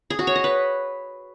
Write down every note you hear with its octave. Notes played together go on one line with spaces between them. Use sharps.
G#4
F#4
C#5
D#5
B4